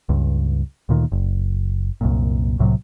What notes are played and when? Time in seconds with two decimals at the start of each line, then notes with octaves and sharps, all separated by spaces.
0.09 C#2 G2
0.89 D2 A#2 D#3
1.12 F#1
2.01 C2 F#2 A#2
2.59 C2 A2 C3 F#3